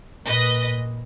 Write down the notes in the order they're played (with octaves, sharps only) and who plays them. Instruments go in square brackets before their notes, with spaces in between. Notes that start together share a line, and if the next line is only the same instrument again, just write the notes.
[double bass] A#2 [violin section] B4 D#5